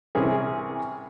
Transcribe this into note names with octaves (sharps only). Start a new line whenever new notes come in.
C2 C3 E3 C#4 G#4 A#4